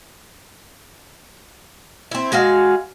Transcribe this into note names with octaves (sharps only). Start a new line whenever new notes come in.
C4 E4
G#3 F#4 G#4 F5